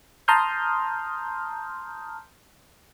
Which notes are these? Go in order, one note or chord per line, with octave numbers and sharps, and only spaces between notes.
A5 A#5 C6 D#6 F6 G6